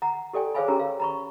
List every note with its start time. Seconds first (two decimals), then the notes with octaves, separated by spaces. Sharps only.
0.02 F#5 A#5
0.33 G4 A4 D5 G5 G#5
0.54 G#4 C5 C#5 F5 G#5 B5
0.68 C#4 G4 A#4 G5 A#5
0.79 F5
1.00 A#5 B5 C#6